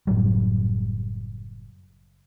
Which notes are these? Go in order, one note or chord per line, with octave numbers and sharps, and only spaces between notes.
F#1 A2 F#3 G3